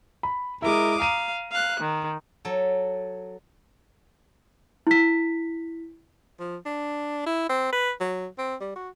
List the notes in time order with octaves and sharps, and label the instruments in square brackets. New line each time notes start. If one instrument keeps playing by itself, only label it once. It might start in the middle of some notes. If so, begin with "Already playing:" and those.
[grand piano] B5
[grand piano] G#3 E4 [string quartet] A#4 D6 D#6
[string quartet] F5 [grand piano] A#5 D#7
[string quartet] F5 F#6
D#3
[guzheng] F#3 A4
[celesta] E4 B6
[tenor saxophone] F3
D4
E4
C4
B4
F#3
C4
G3
F#4